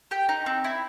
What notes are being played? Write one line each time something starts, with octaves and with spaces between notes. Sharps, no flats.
G4 G5
D#4
C4
E4